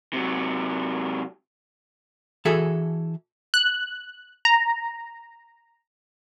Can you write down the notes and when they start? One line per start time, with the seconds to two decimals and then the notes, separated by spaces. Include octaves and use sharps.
0.13 C3 F#3
2.45 E3 F#4 G#4 A4 E5 A5
3.54 F#6
4.45 A#5